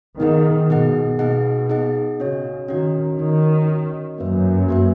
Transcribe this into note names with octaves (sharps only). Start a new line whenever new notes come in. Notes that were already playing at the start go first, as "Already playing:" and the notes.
D#3 B3 D#4 G#4 D#5 F#5
B2 B3 D#4 G#4 D#5 F#5
B2 B3 D#4 G#4 D#5 F#5
B3 D#4 G#4 D#5 F#5
C#3 C#4 F#4 C#5
D#3 C#4 F#4 C#5
D#3 C#4 F#4 C#5
C#4 F#4 C#5
F#2 A#3 C#4 F#4 B4 E5
A#3 C#4 F#4 B4 E5